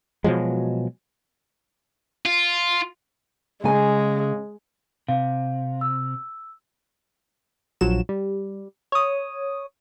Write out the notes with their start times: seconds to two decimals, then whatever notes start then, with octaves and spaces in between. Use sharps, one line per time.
0.24 B2 F3 F#3 G#3
2.26 F4
3.64 C#3 G#3 G#5
5.08 C3 F5
5.81 E6
7.81 A#1 F3 F#3 F#4 E7
8.09 G3
8.92 C#5 D#6